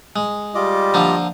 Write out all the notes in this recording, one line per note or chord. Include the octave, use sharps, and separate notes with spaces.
G#3
G3 F4 D#5 D6
D3 F3 A#3